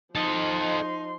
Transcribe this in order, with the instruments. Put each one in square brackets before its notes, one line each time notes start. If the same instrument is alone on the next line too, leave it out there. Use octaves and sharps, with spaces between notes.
[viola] F3 C6 [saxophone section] D#4 [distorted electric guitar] A4 D#5